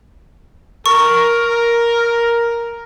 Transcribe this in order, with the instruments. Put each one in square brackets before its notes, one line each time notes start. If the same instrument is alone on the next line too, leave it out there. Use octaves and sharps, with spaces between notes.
[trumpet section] A#4 [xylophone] C#6